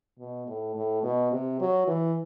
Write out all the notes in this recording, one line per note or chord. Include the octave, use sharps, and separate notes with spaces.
B2
A2
A2
B2
C3
F#3
E3